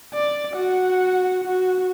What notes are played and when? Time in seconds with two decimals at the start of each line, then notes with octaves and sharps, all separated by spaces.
0.14 D5
0.53 F#4 F#5
1.44 F#4